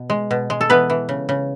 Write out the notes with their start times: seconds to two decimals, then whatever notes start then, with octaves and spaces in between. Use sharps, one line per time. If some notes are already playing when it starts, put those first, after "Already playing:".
Already playing: B2
0.10 G#3
0.31 B2
0.50 G#3
0.61 A4
0.70 E3 B3 B4
0.90 E3
1.09 C#3
1.29 C#3